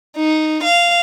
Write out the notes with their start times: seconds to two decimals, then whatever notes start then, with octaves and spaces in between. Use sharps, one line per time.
0.16 D#4
0.64 F5